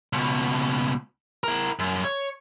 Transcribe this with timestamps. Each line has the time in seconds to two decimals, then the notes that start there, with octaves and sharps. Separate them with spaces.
0.13 C#2 B2
1.44 E4 A#4
1.79 F#2
2.05 C#5